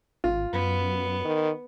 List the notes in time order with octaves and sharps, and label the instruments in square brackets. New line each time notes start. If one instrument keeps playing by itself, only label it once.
[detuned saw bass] G#1 [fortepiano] F4
[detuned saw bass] F#2 [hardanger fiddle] B3
[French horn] D#3